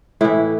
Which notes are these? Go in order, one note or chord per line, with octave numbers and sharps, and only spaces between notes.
A2 E3 E4